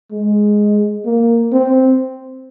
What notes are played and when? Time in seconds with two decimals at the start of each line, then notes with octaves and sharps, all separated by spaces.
0.12 G#3
1.06 A#3
1.53 C4